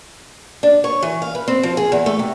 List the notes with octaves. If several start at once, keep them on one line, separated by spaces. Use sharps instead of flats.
D4
C#5
E3
F5
B4
C4
F3
G#4
E2
A3
C3